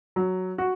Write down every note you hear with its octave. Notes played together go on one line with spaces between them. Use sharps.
F#3
F#4